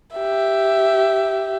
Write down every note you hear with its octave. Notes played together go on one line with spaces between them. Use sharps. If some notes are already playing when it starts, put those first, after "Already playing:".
G4 E5